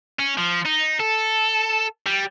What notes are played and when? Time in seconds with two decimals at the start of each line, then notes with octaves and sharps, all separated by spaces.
0.19 C#4
0.38 F3
0.66 D#4
1.00 A4
2.06 G3